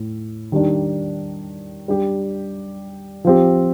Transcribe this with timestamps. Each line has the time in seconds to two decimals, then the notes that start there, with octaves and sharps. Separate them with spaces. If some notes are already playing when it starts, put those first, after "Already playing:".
Already playing: A2
0.52 D#3 G3 D4
1.88 G3 D4 G4
3.25 F3 C4 G4